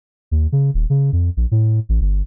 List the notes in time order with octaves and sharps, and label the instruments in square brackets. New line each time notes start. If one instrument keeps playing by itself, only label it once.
[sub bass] D#2
C#3
D#1
C#3
F2
A#1
A2
A1
G1